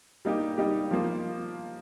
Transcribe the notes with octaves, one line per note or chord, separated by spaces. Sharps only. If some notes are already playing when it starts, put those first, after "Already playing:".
G3 A#3 D#4 G4
G3 A#3 D#4 G4
F3 A#3 F4